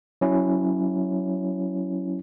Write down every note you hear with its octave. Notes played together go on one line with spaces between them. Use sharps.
F#3 C#4 E4